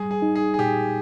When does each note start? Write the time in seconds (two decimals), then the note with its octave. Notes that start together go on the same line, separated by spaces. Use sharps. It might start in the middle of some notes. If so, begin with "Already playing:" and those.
Already playing: G3 G#4
0.11 G#4
0.22 D#4
0.36 G#4
0.54 G#4
0.59 A#2 G4